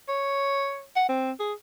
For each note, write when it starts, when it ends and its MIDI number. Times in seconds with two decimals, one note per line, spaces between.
0.09 0.84 73
0.96 1.05 78
1.09 1.32 60
1.40 1.53 68